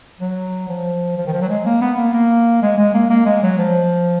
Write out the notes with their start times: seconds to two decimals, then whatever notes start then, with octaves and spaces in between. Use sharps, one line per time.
0.21 F#3
0.69 F3
1.17 F3
1.27 D#3
1.33 F3
1.42 F#3
1.49 G#3
1.65 A#3
1.82 B3
1.97 A#3
2.13 A#3
2.62 G#3
2.78 G#3
2.94 A#3
3.10 A#3
3.25 G#3
3.43 F#3
3.58 F3